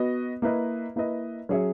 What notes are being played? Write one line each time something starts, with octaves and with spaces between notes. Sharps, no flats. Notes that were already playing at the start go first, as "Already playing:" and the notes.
Already playing: B3 F#4 B4 D#5
A#3 E4 B4 D#5
A#3 E4 B4 D#5
F#3 C#4 G#4 C#5 E5